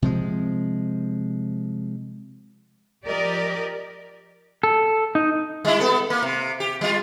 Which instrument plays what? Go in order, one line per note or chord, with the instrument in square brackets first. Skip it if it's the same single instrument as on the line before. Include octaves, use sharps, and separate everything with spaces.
[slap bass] C3 F3 G#3
[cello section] F3 G4 A#4 D5 D#5
[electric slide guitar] A4
D#4
[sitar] G3 E4
B3 A4
A#3
C3
G4
G3 F4